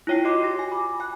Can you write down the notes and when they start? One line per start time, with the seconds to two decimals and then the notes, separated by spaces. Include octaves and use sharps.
0.07 E4 F4 C#5 G5 C7
0.24 F4 F#4 D#5 C6 D6
0.43 G4 A#6
0.59 G#5
0.72 B5 D6
1.00 G#5 F#6